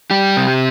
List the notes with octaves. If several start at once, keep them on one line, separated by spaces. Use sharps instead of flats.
G3 G4
C3